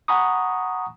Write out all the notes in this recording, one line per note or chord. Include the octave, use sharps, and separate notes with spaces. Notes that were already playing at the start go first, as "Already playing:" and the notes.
F#5 G#5 A#5 B5 C#6 D#6